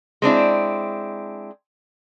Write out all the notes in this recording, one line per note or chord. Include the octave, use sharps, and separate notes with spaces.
G#3 C4 D4 E4